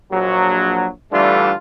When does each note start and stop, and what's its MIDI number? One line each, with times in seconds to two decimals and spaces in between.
0.12 0.87 34
0.12 0.87 54
1.12 1.52 50
1.12 1.52 52
1.12 1.52 55
1.12 1.52 57
1.12 1.52 62
1.12 1.52 65